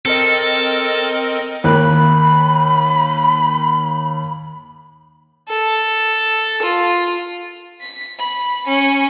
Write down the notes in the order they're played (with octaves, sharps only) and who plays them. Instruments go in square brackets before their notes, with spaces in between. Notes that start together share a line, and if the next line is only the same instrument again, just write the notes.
[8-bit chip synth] C4 A#4 D#5 [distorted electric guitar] A4
[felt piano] D#2 A#3 F#6 [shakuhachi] B5
[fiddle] A4
F4
[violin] B6
B5
C#4